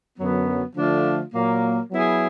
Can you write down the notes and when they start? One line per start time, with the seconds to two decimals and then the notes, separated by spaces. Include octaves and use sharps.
0.19 F#2 D3 F#3 B3
0.76 D3 F3 A3 D4 F4
1.34 A#2 F#3 A#3
1.91 F#3 B3 E4 G#4